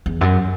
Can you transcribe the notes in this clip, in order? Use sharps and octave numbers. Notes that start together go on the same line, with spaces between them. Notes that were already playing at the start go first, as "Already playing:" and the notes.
E2
F#2